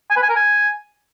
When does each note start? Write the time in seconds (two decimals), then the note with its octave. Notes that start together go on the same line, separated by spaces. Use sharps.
0.10 G#5
0.17 B4
0.23 G#5
0.29 A#4
0.36 G#5